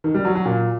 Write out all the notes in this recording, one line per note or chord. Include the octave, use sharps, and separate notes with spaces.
D#3
G3
F#3
F#3
A#2